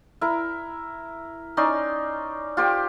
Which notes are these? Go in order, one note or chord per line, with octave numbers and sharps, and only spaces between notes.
E4 A#4
C#4 D#4 D5 C6
F4 G4 C5 G5